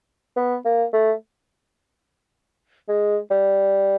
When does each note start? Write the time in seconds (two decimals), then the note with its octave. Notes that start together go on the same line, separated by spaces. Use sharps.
0.37 B3
0.65 A#3
0.93 A3
2.89 G#3
3.31 G3